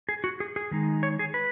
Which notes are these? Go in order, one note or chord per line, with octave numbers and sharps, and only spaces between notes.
G#4
F#4
G#4
G#4
D#3 G#3 D#4
C#5
G#4
B4